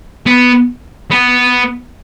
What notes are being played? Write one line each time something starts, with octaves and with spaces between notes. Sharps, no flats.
B3
B3